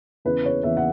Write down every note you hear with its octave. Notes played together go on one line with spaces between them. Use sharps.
E2 C#3 E3 B4
C#5
E2 C#3 E3 E5
F#5